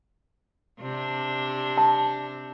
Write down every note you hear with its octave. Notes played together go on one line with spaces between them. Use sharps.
C3 D4
A5